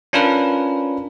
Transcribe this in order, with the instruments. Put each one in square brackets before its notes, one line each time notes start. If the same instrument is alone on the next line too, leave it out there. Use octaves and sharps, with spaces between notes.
[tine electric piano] C#4 D4 F4 A#4 B4